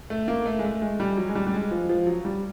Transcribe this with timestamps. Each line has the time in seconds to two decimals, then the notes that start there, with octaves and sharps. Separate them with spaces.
0.10 A3
0.28 A#3
0.46 A3
0.59 G#3
0.64 A3
0.82 G#3
1.00 G3
1.17 F#3
1.29 G#3
1.35 G3
1.47 G3
1.54 G#3
1.71 F3
1.89 F3
2.07 F#3
2.25 G3